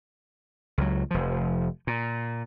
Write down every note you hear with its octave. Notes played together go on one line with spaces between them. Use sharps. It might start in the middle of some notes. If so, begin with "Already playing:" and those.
C#2 F#3
F1 F3
A#2